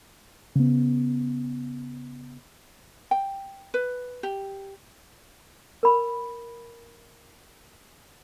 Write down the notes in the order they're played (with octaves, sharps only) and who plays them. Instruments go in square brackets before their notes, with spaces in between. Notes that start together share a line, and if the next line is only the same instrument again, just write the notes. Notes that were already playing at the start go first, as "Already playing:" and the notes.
[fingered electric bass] C#3 B3
[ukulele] G5
B4
G4
[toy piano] A#4 B5